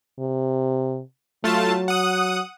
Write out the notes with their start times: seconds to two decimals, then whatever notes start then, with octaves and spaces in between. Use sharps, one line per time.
0.19 C3
1.44 F#3 A3 F4 A5
1.88 F#5 D#6